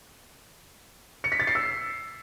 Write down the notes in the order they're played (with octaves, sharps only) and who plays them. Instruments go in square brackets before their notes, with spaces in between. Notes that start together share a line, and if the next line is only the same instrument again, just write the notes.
[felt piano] C#7
B6
A6
C7
E6